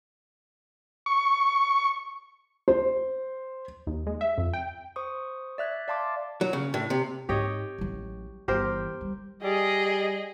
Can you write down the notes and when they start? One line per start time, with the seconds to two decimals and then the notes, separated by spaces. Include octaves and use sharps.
1.06 C#6
2.68 C5
3.87 D#2
4.07 G#3
4.21 E5
4.38 F2
4.53 G5
4.96 C5 C#6 D#6
5.58 D5 E5 F#6 G#6
5.88 D5 F5 A5 C6 D6
6.41 F#3
6.53 C#3
6.74 A2
6.90 C3
7.29 G#2 C4 G4 C#5 D#5
7.78 A1 F#3
8.48 G1 E3 G4 A#4 C5
9.01 G3
9.44 G3 G#4 D#5